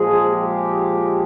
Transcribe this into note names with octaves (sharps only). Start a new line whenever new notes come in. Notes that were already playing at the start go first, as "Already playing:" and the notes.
Already playing: A#2 F3 G#3 G#4
G4